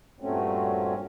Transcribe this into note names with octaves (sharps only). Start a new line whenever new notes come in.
G2 A#2 F#3 A3 C4 C#4